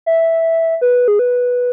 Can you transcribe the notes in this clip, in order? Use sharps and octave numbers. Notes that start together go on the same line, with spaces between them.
E5
B4
G#4
B4